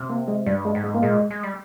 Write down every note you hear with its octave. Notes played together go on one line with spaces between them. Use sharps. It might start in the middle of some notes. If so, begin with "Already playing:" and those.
Already playing: C3
A#3
G#3
G2 G3
G#3
G#2
G#3
A#3
A#2 G#3
G#3
G3